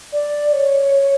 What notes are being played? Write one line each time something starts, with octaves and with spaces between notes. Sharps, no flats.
D5
C#5